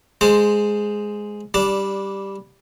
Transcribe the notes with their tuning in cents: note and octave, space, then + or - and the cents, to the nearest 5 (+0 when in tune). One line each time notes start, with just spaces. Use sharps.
G#3 +0 C5 +0 A5 +35
G3 +0 D4 -10 A5 +15